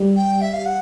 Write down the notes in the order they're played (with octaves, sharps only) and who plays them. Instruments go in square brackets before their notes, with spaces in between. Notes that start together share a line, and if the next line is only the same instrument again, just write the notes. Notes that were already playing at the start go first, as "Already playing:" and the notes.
Already playing: [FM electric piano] G3
[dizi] G5
E5
F5
F#5